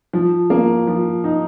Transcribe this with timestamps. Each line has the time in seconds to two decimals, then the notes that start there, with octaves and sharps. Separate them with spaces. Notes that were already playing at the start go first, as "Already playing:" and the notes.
0.13 F3
0.50 A#3
0.87 F3
1.24 D#4